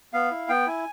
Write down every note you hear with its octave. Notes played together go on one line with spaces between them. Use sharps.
B3 F5
E4
B3 G5
E4 G#5